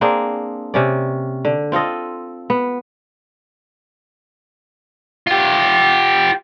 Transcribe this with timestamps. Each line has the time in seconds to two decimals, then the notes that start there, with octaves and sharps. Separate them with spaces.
0.01 A#3 C4 D4 G#4
0.74 C3 C#4 D5
1.45 D3
1.72 C4 F4 A4 D#5
2.50 B3
5.27 F4 G4